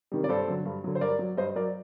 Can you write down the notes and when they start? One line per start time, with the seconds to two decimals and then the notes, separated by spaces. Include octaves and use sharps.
0.12 C3 D#3 G3
0.24 D5
0.29 G2 A4 C5
0.48 D3 F#3
0.65 G2
0.84 D3 F#3
0.95 C5
1.01 G2 A#4 D5
1.19 F#3
1.37 G2 C5 D#5
1.55 F#3 A#4 D5